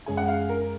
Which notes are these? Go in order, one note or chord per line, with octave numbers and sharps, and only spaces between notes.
F#2 C#3 G#3 C#4 G#4 G#5
F#5
F5
A#4